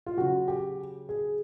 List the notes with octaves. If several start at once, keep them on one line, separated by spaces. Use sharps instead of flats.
F4
C#3 F#3 F#4
G4
G#4